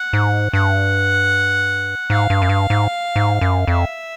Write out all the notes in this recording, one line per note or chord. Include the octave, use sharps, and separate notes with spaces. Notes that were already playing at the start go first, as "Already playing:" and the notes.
Already playing: F#5
G#2
G2 F#5
G#2 F5
G2
F#2
G2
G#2
G#2
F#2
F2 E5